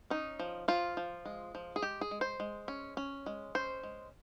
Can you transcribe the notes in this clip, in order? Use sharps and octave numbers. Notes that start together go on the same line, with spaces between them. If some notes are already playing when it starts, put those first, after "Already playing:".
C#4 D#4
F3
F3 F4
F3
G#3
F3
G#4
G#3 G4
G#4
G#3
C5
G#3
C#4
C#4
G#3
C#4 C5
G#3